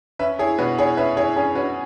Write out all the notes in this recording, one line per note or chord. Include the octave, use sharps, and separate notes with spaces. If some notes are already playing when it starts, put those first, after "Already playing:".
C#4 B4 E5
E4 G#4 C#5
B2 F#4 B4
E4 G#4 C#5
C#4 B4 E5
E4 G#4 C#5
C#4 G#4
C#4 F#4 B4